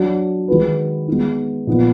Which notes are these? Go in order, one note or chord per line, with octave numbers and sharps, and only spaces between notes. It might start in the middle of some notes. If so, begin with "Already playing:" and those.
Already playing: F#3 D4 F#4
D#3 G#3 D#4 F#4 B4
G#3 B3 D#4
A#2 F3 B3 D#4